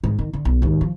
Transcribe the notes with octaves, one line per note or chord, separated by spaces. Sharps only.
G#2
D#3
D3
B1
D#2 G#2
F3